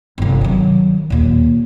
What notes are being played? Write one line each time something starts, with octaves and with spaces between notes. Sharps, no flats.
G1 C3
D#3 F#3
D#2 A#2